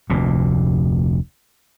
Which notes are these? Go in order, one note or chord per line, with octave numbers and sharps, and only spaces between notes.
F1 D2 A#2